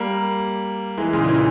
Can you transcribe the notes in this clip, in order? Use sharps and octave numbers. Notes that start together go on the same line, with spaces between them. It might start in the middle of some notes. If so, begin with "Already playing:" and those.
Already playing: G3 A#3
E3 G#3
A#2 C#3
D#3
C#3 E3